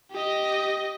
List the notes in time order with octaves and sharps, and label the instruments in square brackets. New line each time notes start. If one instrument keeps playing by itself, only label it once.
[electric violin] G4 D#5